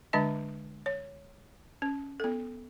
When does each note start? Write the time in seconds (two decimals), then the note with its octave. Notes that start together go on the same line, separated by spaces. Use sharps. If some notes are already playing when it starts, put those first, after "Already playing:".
0.13 D3 G#3 D4 D#5 A5
0.86 C#5
1.82 C#4
2.20 B3 A4